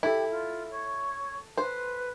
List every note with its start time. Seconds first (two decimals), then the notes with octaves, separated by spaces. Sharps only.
0.03 E4 G4 A4
0.30 F4
0.70 C#5
1.57 B4 C5